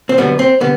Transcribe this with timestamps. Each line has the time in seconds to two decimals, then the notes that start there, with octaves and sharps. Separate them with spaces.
0.09 C4
0.18 F#2 D3 G3 B3
0.39 C4
0.60 D3 G3 B3